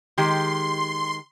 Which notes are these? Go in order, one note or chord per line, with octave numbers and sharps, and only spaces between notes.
D#3 G#3 G4 C6